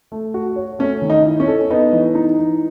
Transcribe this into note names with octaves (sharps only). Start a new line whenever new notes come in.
A3
F#4
C#5
A3 C#4
D#3
D#4
E4
C#4
A4
B3 D#4
E3
D#4
E3